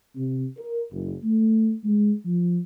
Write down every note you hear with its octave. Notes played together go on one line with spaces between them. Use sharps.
C3
A#4
F#1
A3
G#3
F3